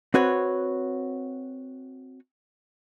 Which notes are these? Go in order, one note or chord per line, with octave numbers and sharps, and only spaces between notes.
C4 F#4 B4 C#5